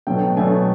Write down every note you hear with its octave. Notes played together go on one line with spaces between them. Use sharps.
B2 F#3 A3 G5
B2 F#3 A3 G#5